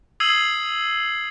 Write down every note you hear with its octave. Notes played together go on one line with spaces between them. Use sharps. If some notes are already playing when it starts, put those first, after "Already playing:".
D#6 E6 G#6 C7 D#7 F#7